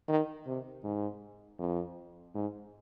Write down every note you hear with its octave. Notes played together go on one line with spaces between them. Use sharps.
D#3
C3
G#2
F2
G#2